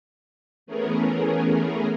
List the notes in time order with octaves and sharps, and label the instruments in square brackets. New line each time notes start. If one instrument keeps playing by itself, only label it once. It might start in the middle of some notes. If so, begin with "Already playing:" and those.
[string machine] E3 A3 B3 C#4 G#4 A#4